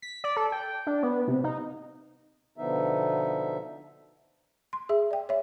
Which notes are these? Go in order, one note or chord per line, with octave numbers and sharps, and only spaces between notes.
B6
D5
A4
G5
D4
B3
C3
D#4
B2 D3 F3 B3 D#4 E5
C6
G#4 E5
D5 G5
C#5 E5